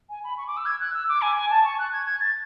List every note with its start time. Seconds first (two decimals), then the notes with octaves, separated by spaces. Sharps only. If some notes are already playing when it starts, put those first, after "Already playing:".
0.10 G#5
0.24 B5
0.38 C#6
0.47 D6
0.57 E6
0.66 G#6
0.80 F#6
0.94 E6
1.09 D6
1.22 G#5
1.36 G#5
1.50 A5
1.65 C#6
1.79 F#6
1.93 G#6
2.06 G#6
2.21 A6